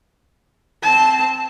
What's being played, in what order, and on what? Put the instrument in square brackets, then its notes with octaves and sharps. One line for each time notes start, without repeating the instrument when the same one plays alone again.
[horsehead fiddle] C4 A5